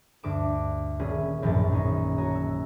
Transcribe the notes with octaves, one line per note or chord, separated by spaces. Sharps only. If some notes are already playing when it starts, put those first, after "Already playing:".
D2 G2 D6 E7
D#1 G3 C#4 G#4 E5
E1 A#1 F#2 A2 F#3 A6
D#3 C#4 D#4
F#4 C#5 D#5 A#5
E6